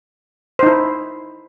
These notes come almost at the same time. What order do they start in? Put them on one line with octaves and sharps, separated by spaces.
C5 D#4 E4